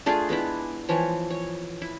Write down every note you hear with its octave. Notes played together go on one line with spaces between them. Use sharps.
A3 D4 F4 G#4
G#3 B3 D4 E4
E3 F3 C#5
C#5
E4